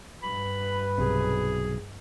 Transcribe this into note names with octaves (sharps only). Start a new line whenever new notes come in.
G2 B4 B5
B1 C3 G#4